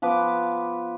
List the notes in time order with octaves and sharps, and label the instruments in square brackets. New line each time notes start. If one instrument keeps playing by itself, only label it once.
[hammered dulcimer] F3 B3 B4 D6